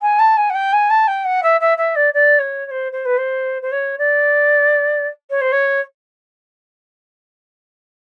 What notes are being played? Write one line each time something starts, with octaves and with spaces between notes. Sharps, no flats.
G#5
A5
G#5
F#5
G5
G#5
A5
G5
F#5
E5
E5
E5
D5
D5
C#5
C#5
C5
C5
B4
C5
C5
C#5
D5
C#5
C5
C#5